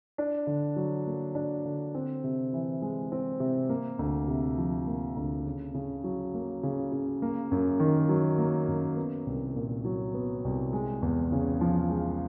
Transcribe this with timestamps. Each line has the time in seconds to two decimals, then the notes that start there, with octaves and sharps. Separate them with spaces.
0.18 D4
0.47 D3
0.76 F#3
1.07 A#3
1.35 D4
1.65 D3
1.95 C4
2.24 C3
2.53 E3
2.82 G#3
3.12 C4
3.40 C3
3.69 A#3
3.99 D2
4.28 C3
4.58 F3
4.87 A#3
5.17 D2
5.46 C#3
5.74 C#3
6.04 F#3
6.34 A#3
6.63 C#3
6.92 C#3
7.22 A#3
7.51 F#2
7.80 D#3
8.09 F#3
8.38 A#3
8.68 F#2
8.97 B3
9.27 C2
9.56 A#2
9.85 F#3
10.14 B3
10.45 C2
10.73 G#3
11.03 E2
11.32 C#3
11.61 F3
11.90 G#3